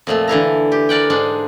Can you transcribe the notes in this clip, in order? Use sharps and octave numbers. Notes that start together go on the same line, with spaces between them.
F2 A#2 A3
D3 E3 E4 A#5
G4
A#4 D5 F#5 G5
G#2 G#3 D4 F#5